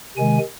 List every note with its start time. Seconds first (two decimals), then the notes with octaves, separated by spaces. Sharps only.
0.17 C3 D#3 G#3 G#5